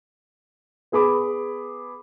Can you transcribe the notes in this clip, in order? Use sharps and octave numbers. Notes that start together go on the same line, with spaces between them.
B3 G#4 B5 D6